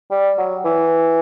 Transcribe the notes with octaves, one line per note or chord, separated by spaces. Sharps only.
G3
F#3
E3